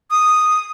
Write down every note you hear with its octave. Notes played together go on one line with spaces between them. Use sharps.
D#6